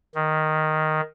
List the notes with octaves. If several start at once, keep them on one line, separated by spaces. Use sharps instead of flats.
D#3